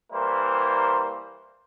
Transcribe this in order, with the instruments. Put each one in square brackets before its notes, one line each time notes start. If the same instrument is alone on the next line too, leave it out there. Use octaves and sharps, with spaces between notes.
[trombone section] E3 G3 A#3 E4 A#4 C5